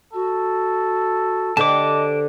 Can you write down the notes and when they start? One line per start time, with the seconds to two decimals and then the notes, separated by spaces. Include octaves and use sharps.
0.13 F#4 A4
1.57 D3 G4 C5 D#5 A5 D6